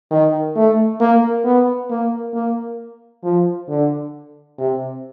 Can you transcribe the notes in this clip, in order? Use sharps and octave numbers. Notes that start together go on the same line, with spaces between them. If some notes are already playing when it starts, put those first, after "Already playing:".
D#3
A3
A#3
B3
A#3
A#3
F3
D3
C3